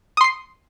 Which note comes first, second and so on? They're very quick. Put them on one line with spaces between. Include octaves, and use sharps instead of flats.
D#6 C6 C7